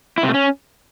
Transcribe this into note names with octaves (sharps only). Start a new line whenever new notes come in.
E4
C3
A3
C#4